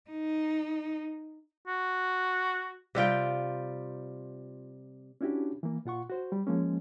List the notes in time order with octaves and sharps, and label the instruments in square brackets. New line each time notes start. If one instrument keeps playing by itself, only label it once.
[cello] D#4
[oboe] F#4
[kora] C3 G3 F4 G5
[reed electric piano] C#4 D4 E4 F#4 G4
E3 A#3
A#2 F4 F#5 C#6
F#4 C5
G3
F3 G#3 A#3 C#4